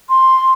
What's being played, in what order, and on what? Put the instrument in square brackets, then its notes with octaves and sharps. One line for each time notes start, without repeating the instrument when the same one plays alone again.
[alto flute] C6